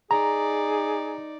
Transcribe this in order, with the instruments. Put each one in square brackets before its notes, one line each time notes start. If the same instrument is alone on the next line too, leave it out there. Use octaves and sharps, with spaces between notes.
[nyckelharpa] D#4 D5 [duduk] G#4 [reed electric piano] A#5